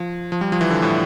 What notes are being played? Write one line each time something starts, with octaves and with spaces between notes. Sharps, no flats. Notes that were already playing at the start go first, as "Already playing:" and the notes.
Already playing: F3
F3
G3
F3
E3
D3
A2